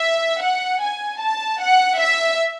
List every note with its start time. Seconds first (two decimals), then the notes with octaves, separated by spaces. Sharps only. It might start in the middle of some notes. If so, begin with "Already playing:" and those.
Already playing: E5
0.42 F#5
0.81 G#5
1.20 A5
1.61 F#5
1.99 E5